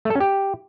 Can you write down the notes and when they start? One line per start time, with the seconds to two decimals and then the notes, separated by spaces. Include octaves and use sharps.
0.05 A3
0.10 A4
0.15 C#4
0.20 G4